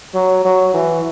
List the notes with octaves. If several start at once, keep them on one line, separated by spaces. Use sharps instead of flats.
F#3
F#3
E3